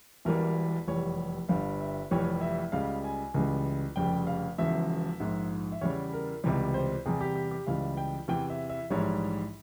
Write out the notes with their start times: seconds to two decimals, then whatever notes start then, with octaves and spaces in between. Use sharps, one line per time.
0.25 E1 E2 E3 G3 A#4
0.87 F1 E2 E3 G3 C#5
1.49 G1 G2 G3 F5
1.81 E5
2.11 F1 F2 E3 G3 C#5
2.41 E5
2.72 C#2 C#3 G3 F5
3.04 G#5
3.34 C#2 C#3 E3 G3
3.96 F1 F2 C#3 G3 G5
4.27 F5
4.58 E1 E2 C#3 F3 E5
5.20 A#1 G#2 F3
5.72 E5
5.81 E2 C#3 E3 G3 C#5
6.13 A#4
6.44 C#2 C3 E3 G3
6.74 C5
7.06 E2 C3 G3 G#4
7.21 G4
7.35 G4
7.51 G4
7.67 C#2 C#3 E3 G3 F5
7.97 G5
8.28 E2 C3 E3 G5
8.50 E5
8.69 E5
8.90 A#1 G#2 E3 G3 C#5